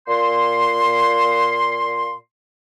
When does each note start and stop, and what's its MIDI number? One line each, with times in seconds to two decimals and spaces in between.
0.07 2.13 46
0.07 2.13 84